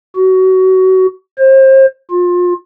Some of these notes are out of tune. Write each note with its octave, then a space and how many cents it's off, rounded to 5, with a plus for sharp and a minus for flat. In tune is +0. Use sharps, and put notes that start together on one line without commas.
F#4 +25
C5 +35
F4 +30